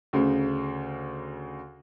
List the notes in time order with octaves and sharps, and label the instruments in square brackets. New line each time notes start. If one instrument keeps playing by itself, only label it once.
[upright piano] D2 C#3